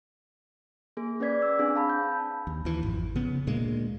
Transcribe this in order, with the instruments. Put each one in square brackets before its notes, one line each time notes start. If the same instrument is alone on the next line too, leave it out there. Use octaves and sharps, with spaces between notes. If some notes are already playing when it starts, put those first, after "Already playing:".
[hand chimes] A#3 G#4
C#4 G#4 B4 D5 G#6 B6
E6
C4 D4 G#4
F5 A5 B5
G6
[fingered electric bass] D#2
D#2 E3
G#1 F2
C#3 B3
D2 A#2 G#3 A#3